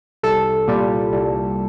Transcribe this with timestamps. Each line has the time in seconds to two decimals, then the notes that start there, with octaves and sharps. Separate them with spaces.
0.23 C2 A4
0.68 A#2 G3
1.12 C2